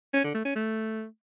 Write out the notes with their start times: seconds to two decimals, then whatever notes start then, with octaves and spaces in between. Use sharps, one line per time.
0.13 C#4
0.24 D3
0.34 A3
0.45 C#4
0.55 A3